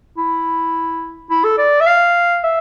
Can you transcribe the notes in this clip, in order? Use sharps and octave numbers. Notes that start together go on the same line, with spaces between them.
E4
E4
A4
D5
E5
F5
E5